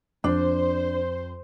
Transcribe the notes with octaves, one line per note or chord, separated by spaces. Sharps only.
F2 D4 C5